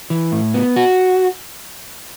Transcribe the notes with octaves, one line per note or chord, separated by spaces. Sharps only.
E3
A2
B3
F#4